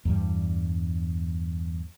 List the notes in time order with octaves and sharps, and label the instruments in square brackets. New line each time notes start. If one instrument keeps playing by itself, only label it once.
[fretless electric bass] E2 G2 G3